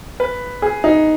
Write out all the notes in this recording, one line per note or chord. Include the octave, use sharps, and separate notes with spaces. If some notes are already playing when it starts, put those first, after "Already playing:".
B4
G#4
D#4